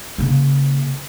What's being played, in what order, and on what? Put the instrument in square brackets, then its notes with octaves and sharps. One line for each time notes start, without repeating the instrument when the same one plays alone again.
[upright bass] C#3 A#3